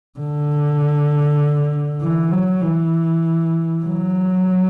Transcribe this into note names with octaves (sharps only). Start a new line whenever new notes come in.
D3
E3
F#3
E3
F#3